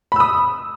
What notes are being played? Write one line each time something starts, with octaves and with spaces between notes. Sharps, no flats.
B5 D#6 E6